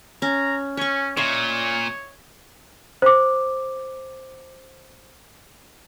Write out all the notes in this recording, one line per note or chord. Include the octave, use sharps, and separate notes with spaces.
C#4 A#5
C#4 C#5 C#6
A#2 C#5 D#5 E5
C5 D6